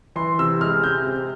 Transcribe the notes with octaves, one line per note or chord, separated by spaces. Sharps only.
E3 C6
C3 E6
G#3 F6
C3 G6
C3